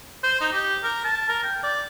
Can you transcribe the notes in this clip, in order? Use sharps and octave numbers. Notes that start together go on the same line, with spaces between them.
C5
D#4
G4
A#4
A5
A#4
G5
D5